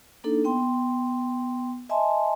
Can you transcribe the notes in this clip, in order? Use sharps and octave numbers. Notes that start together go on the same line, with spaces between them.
A#3 D4 D#4 A4
B3 G5 C6
D#5 E5 G#5 A5 C6